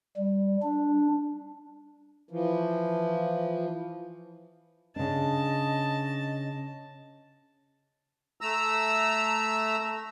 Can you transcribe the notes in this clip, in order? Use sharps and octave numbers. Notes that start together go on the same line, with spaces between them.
G3
D4
E3 F3
C#3 D4 D#5 A5
A3 A#5 E6